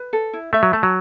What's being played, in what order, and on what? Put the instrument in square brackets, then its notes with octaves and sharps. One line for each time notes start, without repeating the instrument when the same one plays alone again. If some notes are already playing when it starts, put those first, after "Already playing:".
Already playing: [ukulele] B4
A4
E4
[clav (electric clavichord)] A3 [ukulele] E5
[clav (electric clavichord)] F#3
[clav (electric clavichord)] A3 [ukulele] A5
[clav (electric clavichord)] F#3